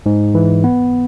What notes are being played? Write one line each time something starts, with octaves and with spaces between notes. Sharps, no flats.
G#2
E3
B3